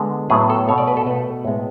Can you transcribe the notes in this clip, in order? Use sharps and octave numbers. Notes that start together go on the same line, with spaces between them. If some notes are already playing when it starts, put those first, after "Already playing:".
Already playing: D3 G#3 B3
A2 F#3 B3 G#4
A4
B2 A3 C#5
D5
B4
A4
B2 A3 B4
A2 G#3 B3